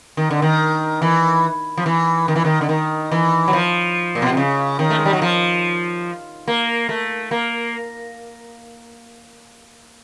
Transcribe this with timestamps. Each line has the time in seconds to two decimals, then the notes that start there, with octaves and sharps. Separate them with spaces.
0.17 D#3
0.31 D3
0.42 D#3
1.02 E3
1.78 F3
1.86 E3
2.28 D#3
2.36 E3
2.45 D#3
2.61 D3
2.69 D#3
3.11 E3
3.48 F#3
3.53 F3
4.15 A#2
4.22 B2
4.30 C3
4.37 C#3
4.79 D#3
4.90 A3
4.98 G#3
5.05 G3
5.13 F#3
5.22 F3
6.48 A#3
6.89 A3
7.31 A#3